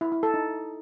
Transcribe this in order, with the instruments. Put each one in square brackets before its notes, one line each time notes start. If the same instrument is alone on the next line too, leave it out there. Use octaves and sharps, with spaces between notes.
[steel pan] E4
E4
A4
D#4